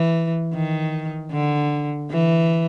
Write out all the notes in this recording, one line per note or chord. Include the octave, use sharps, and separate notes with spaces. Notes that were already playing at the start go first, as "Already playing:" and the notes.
Already playing: E3
D#3
D3
E3